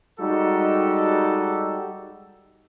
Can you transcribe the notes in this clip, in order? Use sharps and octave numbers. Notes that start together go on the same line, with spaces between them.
G3 G#3 D#4 F#4 G4 A4